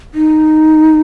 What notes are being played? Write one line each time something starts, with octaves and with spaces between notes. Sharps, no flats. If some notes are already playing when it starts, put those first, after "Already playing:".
D#4